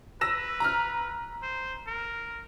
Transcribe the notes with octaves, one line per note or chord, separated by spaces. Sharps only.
B4 E6 A#6 E7
A#5 F6
C5
A#4